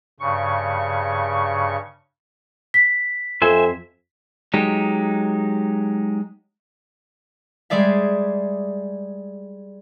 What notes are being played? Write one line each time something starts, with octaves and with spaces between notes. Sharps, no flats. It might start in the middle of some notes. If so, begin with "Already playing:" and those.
G2 C#3 C#6
B6
F2 C5 E5 G#5
F#3 G#3 D#4 G4
G3 G#3 G#4 D5 E5